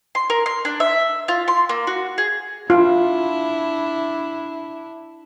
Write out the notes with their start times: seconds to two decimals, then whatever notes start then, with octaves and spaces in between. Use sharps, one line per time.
0.15 C6
0.30 A#4
0.46 C6
0.65 D4
0.80 E5
1.28 F4
1.48 C6
1.69 A#3
1.87 F#4
2.18 G#4
2.70 D4 E4 F4